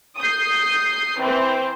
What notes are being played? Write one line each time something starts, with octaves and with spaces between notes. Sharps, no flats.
D#6 G6 C7
E3 C4 C5